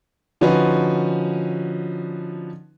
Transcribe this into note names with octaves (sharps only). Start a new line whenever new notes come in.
D3 F3 C#4 D#4 F#4 B4